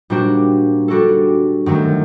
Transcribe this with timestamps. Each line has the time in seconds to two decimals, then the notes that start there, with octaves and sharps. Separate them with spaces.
0.10 A#2 G3 D4 F#4 C5
0.88 G3 D4 F#4 A4
1.66 F#2 D#3 F#3 A3 C4